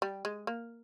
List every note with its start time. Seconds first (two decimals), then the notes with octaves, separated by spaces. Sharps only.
0.02 G3
0.25 G#3
0.47 A#3